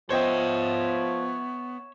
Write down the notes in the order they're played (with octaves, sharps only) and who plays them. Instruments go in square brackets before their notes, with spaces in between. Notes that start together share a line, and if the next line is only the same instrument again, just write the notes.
[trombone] F3 [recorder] B3 [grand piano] C5 D#5 G5 [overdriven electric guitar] C#5 E5